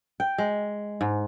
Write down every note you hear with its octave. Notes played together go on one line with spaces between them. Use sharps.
G5
G#3
G#2